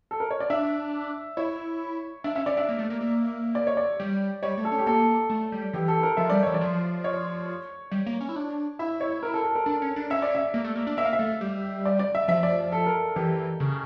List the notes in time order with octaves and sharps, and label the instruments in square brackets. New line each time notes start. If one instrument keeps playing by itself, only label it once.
[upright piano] A4
A#4
C#5
D5
[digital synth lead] D4 [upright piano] E5
[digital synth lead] E4 [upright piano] C#5
[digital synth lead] D4 [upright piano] E5
[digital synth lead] C#4 [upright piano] E5
[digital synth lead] C#4 [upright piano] D5
[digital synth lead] D4 [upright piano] E5
[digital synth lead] A#3
A3
A#3
A#3
[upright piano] D5
C#5
D5
[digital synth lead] G3
[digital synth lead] G3 [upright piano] C#5
[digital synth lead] A3
[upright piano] A4
[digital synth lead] C#4
[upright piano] G4
[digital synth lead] A#3 [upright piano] A4
[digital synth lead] A3
G3
[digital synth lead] E3 [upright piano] G4
[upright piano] A4
A#4
[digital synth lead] F3 [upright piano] E5
[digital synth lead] G3 [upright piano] D5
[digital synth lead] E3 [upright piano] C#5
[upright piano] D5
[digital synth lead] F3
[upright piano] C#5
[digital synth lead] G3
A#3
C#4
E4
D4
[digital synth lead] E4 [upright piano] E5
[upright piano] C#5
A#4
A4
A4
A#4
[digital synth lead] D4
C#4
D4
[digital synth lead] C#4 [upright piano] E5
[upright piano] D5
E5
[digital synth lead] A#3
A3
A#3
D4
[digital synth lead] A#3 [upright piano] E5
[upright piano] F5
E5
[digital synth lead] A3
G3
[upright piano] D5
D5
E5
[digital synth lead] F3 [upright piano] E5
[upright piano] D5
A4
A#4
[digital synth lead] E3 [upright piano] G4
[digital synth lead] C#3